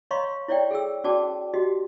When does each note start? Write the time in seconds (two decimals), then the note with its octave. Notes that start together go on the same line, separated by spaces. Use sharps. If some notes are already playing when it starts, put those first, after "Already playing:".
0.11 C#5 D#5 F5 A#5 C6 C#6
0.48 E4 C#5 D5 E5 G5
0.71 G#4 A4 G5 E6
1.04 C#4 F#4 D5 G5 A5 D6
1.54 F#4 G4 D#5